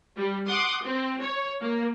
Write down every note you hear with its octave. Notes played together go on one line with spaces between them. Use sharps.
G3
F#5 C6 D6 D#6
C4
C#5
A#3